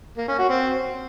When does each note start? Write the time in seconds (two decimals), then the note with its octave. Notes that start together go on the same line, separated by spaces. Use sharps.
0.17 A#3
0.28 C#4
0.39 F#4
0.49 C4